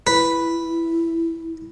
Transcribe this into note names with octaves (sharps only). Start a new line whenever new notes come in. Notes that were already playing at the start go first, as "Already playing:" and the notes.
E4 B4